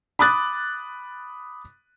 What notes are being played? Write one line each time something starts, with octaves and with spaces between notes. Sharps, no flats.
B5 D6 D#6 F#6 A6